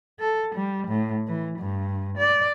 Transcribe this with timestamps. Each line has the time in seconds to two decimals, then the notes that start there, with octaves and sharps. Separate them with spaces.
0.20 A4
0.55 G3
0.88 A2
1.27 E3
1.59 G2
2.18 D5